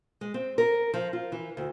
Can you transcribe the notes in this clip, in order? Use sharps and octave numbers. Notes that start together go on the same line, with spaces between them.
G#3
C4
A#4
F3
F4
E3
D2